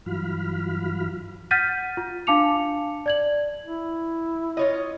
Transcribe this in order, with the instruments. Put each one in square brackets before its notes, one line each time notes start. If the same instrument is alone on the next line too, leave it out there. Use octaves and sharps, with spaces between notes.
[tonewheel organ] G2 E3 F#3 F4 B5 F6
[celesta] F#5 F6 G6 A6 B6 D#7
F4
D4 F5 A5 D6 C#7 F7
D5 G#6 F#7
[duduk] E4
[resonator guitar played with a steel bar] F4 C#5 D#5